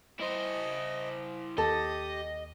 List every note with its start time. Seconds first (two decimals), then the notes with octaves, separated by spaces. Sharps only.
0.20 E4 C5 D#5
1.58 D#2 G4 A4 D#5